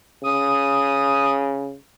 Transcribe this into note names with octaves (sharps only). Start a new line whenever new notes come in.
C#3 D#6